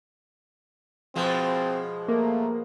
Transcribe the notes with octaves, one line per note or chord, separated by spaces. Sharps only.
B2 F3 G#3 C4
A3 A#3